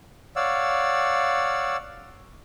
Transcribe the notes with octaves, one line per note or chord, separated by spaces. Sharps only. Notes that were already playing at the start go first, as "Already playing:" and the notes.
C#5 D5 F5 F#5 E6